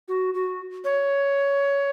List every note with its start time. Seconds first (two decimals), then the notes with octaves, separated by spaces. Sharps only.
0.08 F#4
0.34 F#4
0.85 C#5